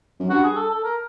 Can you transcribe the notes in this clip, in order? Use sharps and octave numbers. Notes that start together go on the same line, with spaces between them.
F#2
G2 F#4
G#4
A4
A4
A#4